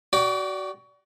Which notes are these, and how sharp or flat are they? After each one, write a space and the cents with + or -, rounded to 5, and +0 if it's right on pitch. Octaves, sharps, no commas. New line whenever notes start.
F#4 +25 D5 -15 G5 +0